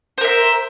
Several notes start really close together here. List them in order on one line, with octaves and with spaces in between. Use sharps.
C5 A#4 E5